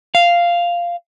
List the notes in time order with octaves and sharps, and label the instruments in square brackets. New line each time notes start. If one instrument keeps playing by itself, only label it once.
[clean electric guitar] F5